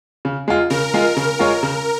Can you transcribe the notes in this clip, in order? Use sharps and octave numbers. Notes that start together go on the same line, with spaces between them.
C#3
G#3 F4
C#3 A#4
G#3 F4
C#3 A#4
G#3 F4 C#5
C#3